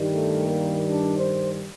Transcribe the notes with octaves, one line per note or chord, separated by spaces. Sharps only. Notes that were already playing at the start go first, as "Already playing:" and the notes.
Already playing: G2 D#3 G3
A3
A#3
D4
C5